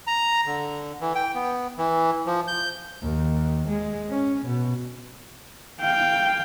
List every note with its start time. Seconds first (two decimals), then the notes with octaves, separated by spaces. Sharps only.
0.07 A#5
0.46 D3
1.01 E3
1.15 G5
1.35 B3
1.78 E3
2.26 F3
2.48 G6
3.02 D#2
3.68 G#3
4.09 C#4
4.46 B2
5.81 F5 G5